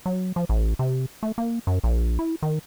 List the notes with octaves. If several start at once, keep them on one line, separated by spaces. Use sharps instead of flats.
F#3
F3
A1
C3
A3
A#3
F#2
A#1
E4
D#3